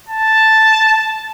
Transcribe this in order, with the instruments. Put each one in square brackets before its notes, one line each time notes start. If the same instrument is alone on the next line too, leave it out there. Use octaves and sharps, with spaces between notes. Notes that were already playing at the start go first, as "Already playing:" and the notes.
[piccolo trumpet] A5